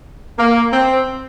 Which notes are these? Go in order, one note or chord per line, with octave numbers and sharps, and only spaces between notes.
A#3
C4